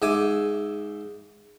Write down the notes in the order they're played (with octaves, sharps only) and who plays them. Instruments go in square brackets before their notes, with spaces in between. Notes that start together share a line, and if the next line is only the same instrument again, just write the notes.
[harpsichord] G#2 E5 G#5 D6